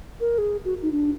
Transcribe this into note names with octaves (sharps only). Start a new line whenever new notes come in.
A#4
G#4
F#4
D#4
D4